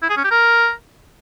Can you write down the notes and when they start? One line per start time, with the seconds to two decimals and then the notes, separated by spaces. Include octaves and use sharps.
0.03 E4
0.10 G#4
0.17 C#4
0.24 G4
0.31 A#4